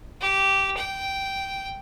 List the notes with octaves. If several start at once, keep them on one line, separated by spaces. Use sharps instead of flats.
G4
G5